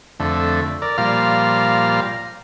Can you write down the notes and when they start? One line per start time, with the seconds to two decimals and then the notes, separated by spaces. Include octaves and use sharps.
0.20 F2 D3 A3
0.82 A#4 D5
0.98 A#2 F3 G3 F5 A#5 F6